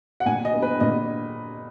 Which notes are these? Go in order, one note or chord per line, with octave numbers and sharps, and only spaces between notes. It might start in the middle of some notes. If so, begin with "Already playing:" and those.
F#5
A#2 G#5
D#5
B3
B4
A#2 D#5